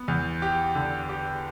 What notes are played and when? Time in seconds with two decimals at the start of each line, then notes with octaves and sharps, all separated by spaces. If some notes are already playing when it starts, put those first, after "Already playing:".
Already playing: B3
0.08 E2
0.42 G4
0.75 D3
1.09 G4